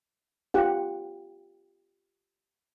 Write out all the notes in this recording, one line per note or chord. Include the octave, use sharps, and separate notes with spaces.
F4 G4 F#5